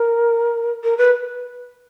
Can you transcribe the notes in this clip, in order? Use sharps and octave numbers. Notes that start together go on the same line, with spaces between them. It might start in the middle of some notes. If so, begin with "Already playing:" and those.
Already playing: A#4
A#4
B4